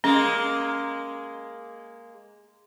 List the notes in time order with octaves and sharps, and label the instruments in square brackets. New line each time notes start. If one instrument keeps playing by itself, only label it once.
[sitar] G#3 A#3 [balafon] C#4